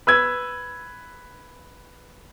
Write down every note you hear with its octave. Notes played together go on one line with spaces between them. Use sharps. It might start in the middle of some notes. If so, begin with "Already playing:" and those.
B4 E6 G#6